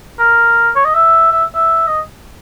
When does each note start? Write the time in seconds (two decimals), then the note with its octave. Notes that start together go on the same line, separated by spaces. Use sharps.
0.19 A#4
0.76 C#5
0.85 D#5
0.94 E5
1.31 E5
1.55 E5
1.87 D#5